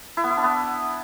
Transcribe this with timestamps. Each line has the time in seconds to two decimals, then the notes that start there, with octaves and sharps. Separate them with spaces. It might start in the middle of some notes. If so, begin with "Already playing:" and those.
0.17 E4
0.24 B3
0.30 E4
0.37 D4
0.44 B3